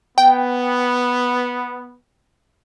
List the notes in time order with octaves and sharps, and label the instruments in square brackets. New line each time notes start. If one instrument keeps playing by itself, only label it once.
[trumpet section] B3 [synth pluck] G5